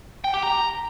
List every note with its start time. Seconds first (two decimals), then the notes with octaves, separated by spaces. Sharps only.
0.24 G5
0.34 G4
0.43 A#5